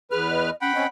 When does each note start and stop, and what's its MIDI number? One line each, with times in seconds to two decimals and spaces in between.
0.11 0.50 40
0.11 0.27 68
0.11 0.50 71
0.11 0.50 89
0.29 0.55 75
0.61 0.72 61
0.61 0.87 78
0.61 0.87 79
0.61 0.87 83
0.75 0.86 60
0.75 0.86 61
0.75 0.86 75